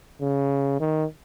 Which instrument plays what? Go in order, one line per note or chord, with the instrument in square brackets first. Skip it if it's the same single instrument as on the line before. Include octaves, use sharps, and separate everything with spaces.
[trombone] C#3
D#3